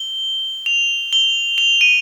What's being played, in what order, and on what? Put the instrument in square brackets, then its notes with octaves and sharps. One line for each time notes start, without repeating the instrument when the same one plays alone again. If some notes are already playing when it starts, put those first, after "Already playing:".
Already playing: [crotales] G7
F7
G7
F7
D#7